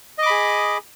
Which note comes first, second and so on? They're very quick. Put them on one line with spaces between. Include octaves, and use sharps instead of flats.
D#5 D6 B5 G#4